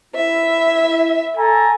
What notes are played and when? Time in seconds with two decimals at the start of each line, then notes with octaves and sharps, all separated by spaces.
0.15 E4 E5
1.37 A4 G#5 A#5